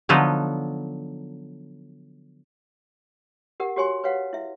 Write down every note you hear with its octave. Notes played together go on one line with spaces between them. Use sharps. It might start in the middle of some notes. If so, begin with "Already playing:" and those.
D3 F3 F#3 B3 D#4
G4 A#4 F#5
F#4 G4 C#5 G#5 C6
B4 C#5 F5 F#5
E4 E5